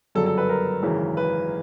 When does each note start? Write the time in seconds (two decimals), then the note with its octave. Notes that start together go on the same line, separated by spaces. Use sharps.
0.15 G1 F#2 C#3 F#3 A4
0.26 A4
0.38 B4
0.49 A#4
0.82 G#1 F#2 C#3 E3
1.17 B4